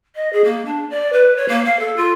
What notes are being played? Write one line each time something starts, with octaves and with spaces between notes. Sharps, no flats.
D#5
G#4
A#3
D4
D5
B4
C#5
A#3
F5
A4
F4